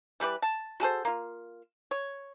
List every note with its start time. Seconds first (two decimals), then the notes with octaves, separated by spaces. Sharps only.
0.20 E3 G3 B4 D5
0.42 A5
0.80 F#4 G#4 A4 C5
1.05 A#3 F4
1.91 C#5